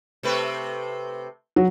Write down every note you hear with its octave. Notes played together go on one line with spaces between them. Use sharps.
C3 A3 B4
F#3